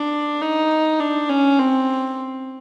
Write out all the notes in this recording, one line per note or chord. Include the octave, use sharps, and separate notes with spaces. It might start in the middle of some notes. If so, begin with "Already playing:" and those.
Already playing: D4
D#4
D4
C#4
C4